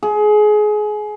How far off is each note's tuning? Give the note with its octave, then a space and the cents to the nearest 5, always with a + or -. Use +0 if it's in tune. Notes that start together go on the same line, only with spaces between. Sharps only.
G#4 +25